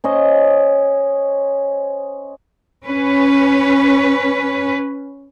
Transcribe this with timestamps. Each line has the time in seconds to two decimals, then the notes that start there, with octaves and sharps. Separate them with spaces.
0.04 C#4 C5 D#5
2.84 C#4 B4